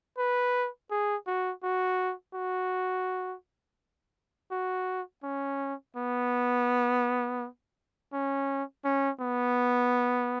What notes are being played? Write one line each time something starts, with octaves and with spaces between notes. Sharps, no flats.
B4
G#4
F#4
F#4
F#4
F#4
C#4
B3
C#4
C#4
B3